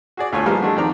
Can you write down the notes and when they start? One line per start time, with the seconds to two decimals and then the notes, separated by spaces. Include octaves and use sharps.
0.17 F#4 G#4 D5
0.33 D2 A3 F4 C#5 G#5
0.46 A#2 E3 F3 G3 G#3 A#3
0.61 G#3 A3 D4 F#4
0.76 F2 D#3 C4 D5 A#5